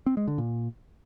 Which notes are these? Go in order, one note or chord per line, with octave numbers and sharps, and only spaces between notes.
C4
G#3
D3
A#2